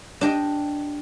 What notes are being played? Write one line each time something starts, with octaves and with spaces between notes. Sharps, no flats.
D4 G4 D#5